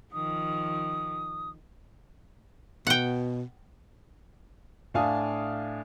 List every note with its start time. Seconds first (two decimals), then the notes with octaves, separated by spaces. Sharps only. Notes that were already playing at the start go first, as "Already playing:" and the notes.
0.13 D#3 F3 D#6
2.87 B2 F#5 G5
4.94 A2 D4 F5 G#5 D#6